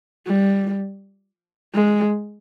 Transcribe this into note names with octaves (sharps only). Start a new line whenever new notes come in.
G3
G#3